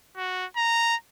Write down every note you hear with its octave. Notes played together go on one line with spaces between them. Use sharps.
F#4
A#5